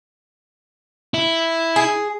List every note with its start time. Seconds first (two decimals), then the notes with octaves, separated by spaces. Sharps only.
1.14 E4
1.76 G#4